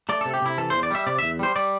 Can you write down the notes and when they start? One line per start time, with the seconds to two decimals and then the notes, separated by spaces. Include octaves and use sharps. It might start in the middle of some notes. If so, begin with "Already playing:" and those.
0.09 A3 D5
0.21 C3 A4
0.34 G4
0.42 C3 E4
0.58 E3 A4
0.70 E2 C5
0.83 D5
0.91 G3 E5
1.07 C3 D5
1.19 E2 E5
1.39 G3 C5
1.56 G3 D5